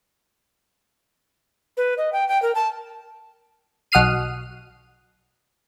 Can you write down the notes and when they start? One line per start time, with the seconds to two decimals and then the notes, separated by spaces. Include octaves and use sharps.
1.77 B4
1.98 D#5
2.13 G5
2.29 G5
2.42 A#4
2.55 A5
3.92 B1 F#5 D#6 F6 C7 D#7